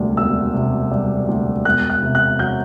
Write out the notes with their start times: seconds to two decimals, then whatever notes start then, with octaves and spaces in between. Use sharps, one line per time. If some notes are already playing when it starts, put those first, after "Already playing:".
Already playing: E1 D2 C3 G3
0.17 E1 E6
0.54 C3
0.91 G3
1.28 D2
1.65 E1 F#6
1.90 F#6
2.03 C3
2.15 F#6
2.39 F#3 G6